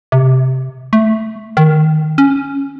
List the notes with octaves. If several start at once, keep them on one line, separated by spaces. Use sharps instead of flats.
C3
A3
D#3
C#4